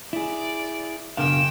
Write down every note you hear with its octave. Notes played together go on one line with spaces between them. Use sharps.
E4 G#4 D5
F#1 B2 D4 A#4 F5 G5 D7 E7